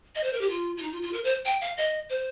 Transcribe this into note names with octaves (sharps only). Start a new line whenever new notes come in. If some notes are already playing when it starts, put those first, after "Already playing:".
D#5
C5
A#4
G4
F4
F4
D#4
F4
F4
A#4
C5
G5
F5
D#5
C5